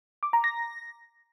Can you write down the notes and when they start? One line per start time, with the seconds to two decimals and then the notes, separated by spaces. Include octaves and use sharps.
0.23 D6
0.33 A#5
0.44 A#6